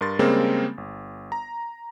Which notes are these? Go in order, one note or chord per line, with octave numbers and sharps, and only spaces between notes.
G2 A#4 C6 A6
C#3 G3 G#3 A#3 C4 A#4
G1
A#5